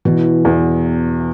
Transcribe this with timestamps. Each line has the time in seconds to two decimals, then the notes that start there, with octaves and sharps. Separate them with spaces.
0.05 B2 E3
0.45 E2